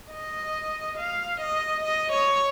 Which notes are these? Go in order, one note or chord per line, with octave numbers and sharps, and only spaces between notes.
D#5
F5
D#5
D#5
C#5